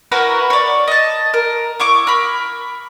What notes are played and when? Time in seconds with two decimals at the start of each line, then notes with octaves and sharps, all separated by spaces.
0.12 E4 F#4 A#4 B4
0.50 C#5 D5
0.88 D#5 A5
1.34 A#4
1.80 E4 C#6 D6
2.07 A#4 B5